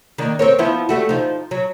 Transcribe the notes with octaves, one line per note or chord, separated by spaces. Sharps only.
D#3 A#3 D4
C4 A#4 C#5
F3 B3 E4
G3 A3 F#4
F3 D#4
F#3